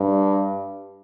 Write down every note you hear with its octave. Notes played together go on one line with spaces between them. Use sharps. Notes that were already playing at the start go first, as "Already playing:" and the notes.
Already playing: G2